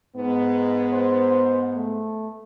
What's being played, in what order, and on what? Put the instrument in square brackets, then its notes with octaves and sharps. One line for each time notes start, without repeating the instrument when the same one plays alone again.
[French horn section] G#2 B3
[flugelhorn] C5
A3